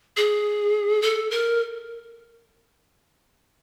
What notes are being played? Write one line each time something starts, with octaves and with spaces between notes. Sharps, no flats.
G#4
A4
A#4